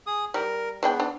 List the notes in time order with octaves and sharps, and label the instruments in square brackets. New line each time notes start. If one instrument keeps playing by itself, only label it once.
[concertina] G#4 D#6
[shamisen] G3 [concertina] A#4
[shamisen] G#3 D4 G5 [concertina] B3
[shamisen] D4